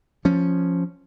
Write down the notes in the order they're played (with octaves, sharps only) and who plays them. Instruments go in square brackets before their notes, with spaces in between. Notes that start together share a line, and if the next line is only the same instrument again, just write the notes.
[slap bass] F3 C#4